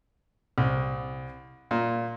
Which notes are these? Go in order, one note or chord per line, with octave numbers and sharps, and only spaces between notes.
C2
A#2